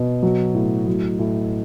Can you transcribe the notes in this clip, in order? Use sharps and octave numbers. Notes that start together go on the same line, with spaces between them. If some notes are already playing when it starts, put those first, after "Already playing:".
Already playing: B2
F#3
A2
F#3
A2